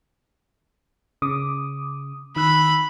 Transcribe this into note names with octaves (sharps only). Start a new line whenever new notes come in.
C#3 D6 D#6
D#3 B5 E6 F#6